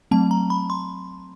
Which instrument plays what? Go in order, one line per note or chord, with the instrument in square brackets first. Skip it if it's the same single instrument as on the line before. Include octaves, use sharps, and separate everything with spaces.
[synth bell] F#3 A3 C4 A5
A#5
B5
C6